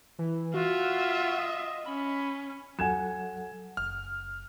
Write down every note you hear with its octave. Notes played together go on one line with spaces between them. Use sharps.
E3
F4 F#4 E5
D#5
C#4 B5
F#3 A4 F#5 G#5 G#6 E7
F#1 F6